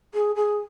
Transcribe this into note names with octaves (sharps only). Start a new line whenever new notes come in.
G#4
G#4